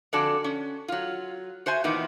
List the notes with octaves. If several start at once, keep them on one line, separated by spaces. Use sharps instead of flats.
F2 D3 F#4 A4 D5 G#5
C#4
F#3 F4
F#4 C5 E5 G#5
A#2 D#3 E3 B3